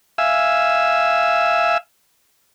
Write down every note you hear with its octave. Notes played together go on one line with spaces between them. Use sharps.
E5 F5 G#5 E6